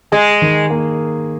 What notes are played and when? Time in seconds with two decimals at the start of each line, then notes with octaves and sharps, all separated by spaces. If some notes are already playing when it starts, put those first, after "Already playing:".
0.12 G#3 G#4
0.42 D#3
0.70 A#3